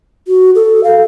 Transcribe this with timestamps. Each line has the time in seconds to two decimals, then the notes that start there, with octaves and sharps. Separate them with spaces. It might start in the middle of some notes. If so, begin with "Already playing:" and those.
0.28 F#4
0.55 A4
0.84 F5